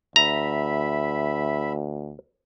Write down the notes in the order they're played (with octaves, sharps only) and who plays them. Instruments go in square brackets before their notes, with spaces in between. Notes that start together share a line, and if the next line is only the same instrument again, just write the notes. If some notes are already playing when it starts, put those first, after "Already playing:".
[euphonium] D2 [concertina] E5 B5 [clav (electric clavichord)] A#5